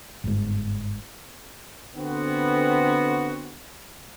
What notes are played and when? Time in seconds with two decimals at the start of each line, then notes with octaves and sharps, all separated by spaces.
0.24 G1 G#2
1.96 D3 B3 C4 F#4